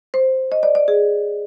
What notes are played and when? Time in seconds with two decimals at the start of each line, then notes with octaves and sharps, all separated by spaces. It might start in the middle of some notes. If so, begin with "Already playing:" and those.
0.14 C5
0.52 D#5
0.63 D5
0.75 D5
0.88 G#4